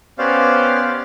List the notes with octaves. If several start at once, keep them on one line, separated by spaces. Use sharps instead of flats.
B3 C#4 G4 C5 D5 F5